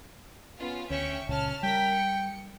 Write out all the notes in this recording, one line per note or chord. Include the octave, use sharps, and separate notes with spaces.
B3 C#4 F4
D2 C#4 E5 G5 C#6
C#2 A#2 C#3 C#4 A5 F6
G3 A#4 G5 B6
C#7